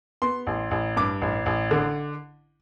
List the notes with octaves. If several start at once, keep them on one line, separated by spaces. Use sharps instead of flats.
B3 C6
A1
A1
G2 D6
A1
A1
D3